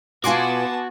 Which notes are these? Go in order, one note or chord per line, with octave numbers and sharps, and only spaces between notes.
B2 B3 F4 F#4 G#5 A5 C6 D6